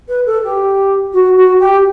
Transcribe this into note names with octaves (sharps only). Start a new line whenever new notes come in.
B4
A4
G4
F#4
F#4
G4